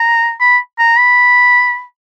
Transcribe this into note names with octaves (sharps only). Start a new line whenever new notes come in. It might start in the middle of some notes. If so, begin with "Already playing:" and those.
Already playing: A#5
B5
A#5
B5